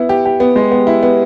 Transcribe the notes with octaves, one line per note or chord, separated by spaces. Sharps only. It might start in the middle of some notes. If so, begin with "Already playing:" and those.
Already playing: B3 E4
G4
G4
B3
G#3
B3
E4
B3